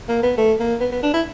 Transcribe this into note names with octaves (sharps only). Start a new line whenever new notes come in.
A#3
B3
A3
A#3
B3
B3
D4
E4